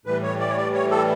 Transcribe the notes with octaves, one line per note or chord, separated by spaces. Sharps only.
A2 E3 G3 B4
C#5
D5
C#5
D5
C#5
A4